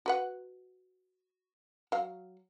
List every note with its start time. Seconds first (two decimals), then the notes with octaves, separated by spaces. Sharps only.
0.06 F#4 B4 F#5
1.92 F#3 F5